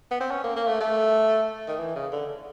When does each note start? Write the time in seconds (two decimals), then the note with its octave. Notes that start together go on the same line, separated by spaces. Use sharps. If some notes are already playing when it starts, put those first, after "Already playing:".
0.11 B3
0.20 C4
0.31 C#4
0.44 A#3
0.56 A#3
0.67 A3
0.80 A3
1.68 D#3
1.79 E3
1.95 C#3
2.12 D3